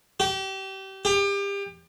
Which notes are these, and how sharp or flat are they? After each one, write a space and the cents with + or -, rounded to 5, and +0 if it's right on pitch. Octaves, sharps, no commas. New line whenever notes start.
G4 -30
G4 +30